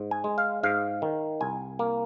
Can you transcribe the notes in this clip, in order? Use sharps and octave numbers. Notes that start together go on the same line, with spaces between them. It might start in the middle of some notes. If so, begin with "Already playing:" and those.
Already playing: G#2
G#5
G#3
F5
G#2 F5
D#3
C2 G#5
A#3